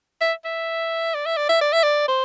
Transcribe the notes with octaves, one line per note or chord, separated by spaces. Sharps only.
E5
E5
D5
E5
D5
E5
D5
E5
D5
C5